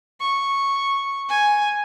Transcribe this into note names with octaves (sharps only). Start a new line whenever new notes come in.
C#6
G#5